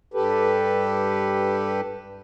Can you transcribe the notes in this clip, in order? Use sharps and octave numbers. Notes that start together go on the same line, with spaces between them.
G2 G4 A4 B4